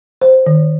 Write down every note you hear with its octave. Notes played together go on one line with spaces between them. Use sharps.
C5
D#3